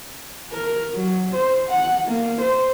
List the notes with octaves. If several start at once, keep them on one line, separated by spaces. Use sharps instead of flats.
A#4
F#3
C5
F#5
A#3
C5